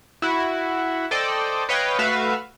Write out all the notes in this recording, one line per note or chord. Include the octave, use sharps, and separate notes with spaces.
E4 F#4
A4 C5 D5 D#5 G5
B4 C#5 D#5 F5 G5
A3 F#4 B4 E5 F5